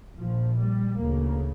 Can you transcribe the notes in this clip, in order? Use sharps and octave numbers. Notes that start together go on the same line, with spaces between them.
A#1 A#2 F3
G3
D2 C#3 A#3